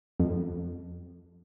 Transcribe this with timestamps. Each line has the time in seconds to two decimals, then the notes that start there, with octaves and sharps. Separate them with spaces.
0.20 F2